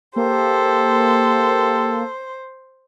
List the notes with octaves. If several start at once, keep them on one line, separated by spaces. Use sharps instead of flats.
A#3 G4 A4 C5